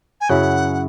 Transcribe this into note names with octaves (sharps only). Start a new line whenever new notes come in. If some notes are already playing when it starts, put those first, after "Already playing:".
G#5
F#2 C#3 F#3 C#4 E4 F#5